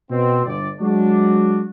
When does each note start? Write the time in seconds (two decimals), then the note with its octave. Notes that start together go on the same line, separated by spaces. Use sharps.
0.10 B2 C4
0.45 G1 D5
0.80 F#3 G#3 D4 F#4